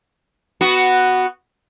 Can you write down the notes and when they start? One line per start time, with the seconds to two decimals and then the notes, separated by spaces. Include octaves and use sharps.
0.61 B3 F#4